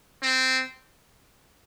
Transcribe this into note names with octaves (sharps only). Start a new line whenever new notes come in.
C4